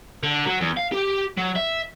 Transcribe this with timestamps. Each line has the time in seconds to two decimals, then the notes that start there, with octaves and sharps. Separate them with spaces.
0.23 D3
0.46 F#3
0.60 E2
0.77 F5
0.92 G4
1.38 F#3
1.56 E5